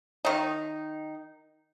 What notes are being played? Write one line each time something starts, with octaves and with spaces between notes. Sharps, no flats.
D#3 D#4